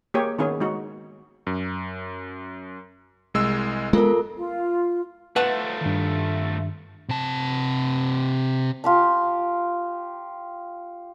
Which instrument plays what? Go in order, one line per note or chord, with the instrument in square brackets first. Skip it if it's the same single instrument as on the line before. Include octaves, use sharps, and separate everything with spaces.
[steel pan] A#3 G4 G#4 C#5
D#3 B3 C#4 G#4
G#3 D#4 F#4
[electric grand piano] F#2
C2 G#3 E6
[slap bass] G#3 B3 [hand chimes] F4 A4 A#4
[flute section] F4
[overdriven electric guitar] A3 F4 [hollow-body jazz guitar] B4 F#5 A5
[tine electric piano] G2 D#3
[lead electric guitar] C3 A5
[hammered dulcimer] F4 G4 A5